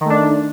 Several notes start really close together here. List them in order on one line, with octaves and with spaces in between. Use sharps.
D#3 A3 D4